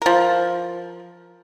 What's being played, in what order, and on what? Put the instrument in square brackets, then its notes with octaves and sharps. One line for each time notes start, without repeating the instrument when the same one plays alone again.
[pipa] F3 A#4